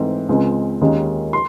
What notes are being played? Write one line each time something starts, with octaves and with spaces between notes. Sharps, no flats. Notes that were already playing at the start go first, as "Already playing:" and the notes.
Already playing: G#2 E3 A3 C4
C#2 C#3 G#3 C4
D#2 D#3 G#3 C#4
C6